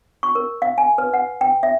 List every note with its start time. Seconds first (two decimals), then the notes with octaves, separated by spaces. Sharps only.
0.23 C#6
0.35 A#4
0.62 F5
0.78 G#5
0.98 B4
1.14 F#5
1.41 G5
1.63 E5